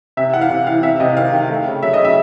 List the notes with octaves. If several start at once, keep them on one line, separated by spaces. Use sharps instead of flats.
C3 E5
E3 F#5
F5
C3
E3 F5
C3 E5
C3 D#5
D#3 F5
D#3
A3
C#3
F#3 E5
D#5
C#3
E5